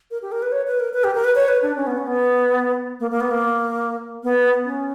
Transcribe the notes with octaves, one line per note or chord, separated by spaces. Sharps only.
A#4
G4
A#4
B4
C#5
B4
A#4
B4
G4
A#4
B4
C#5
B4
D4
C#4
B3
C#4
B3
A#3
A#3
B3
A#3
B3
C#4